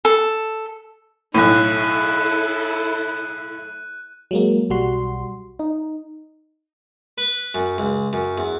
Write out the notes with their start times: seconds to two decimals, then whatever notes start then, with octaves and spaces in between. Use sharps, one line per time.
0.05 A4
1.34 B1 A2 E4 A4 F#6 D#7
4.31 F#3 G#3 A#3
4.70 B1 G3 F#4 C6
5.59 D#4
7.18 B4
7.55 F#2
7.78 C#2
8.13 F#2
8.38 E2